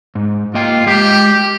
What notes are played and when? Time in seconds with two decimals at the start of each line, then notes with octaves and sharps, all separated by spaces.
0.15 G#2
0.55 A#3 F4 D#5 G5
0.87 G#3 G4 D#5 G5